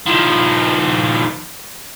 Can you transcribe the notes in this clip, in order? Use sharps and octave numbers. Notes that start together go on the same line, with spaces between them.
D#3 F3